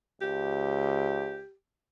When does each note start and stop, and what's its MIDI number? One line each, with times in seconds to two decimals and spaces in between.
0.21 1.40 37
0.21 1.53 67